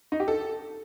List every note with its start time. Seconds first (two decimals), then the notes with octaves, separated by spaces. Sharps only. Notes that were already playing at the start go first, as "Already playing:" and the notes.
0.12 D#4
0.20 G4
0.28 A4